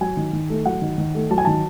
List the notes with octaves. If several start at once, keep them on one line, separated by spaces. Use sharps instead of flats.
F#3 G#5
D#3
D#3
A3
F#3 F#5
D#3
D#3
A3
F#3 A5
G#5
D#3 A5